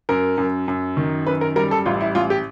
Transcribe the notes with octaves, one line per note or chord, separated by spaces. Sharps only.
F#2 A#4
F#2
F#2
D#3
F#2 B4
A#4
G3 A#4
A4
A1 F4
E4
A1 F4
G4